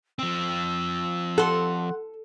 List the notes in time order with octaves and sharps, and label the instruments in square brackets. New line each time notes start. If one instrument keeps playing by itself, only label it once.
[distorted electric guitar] F3 C4 [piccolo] E6
[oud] A4 [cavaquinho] F#5 C6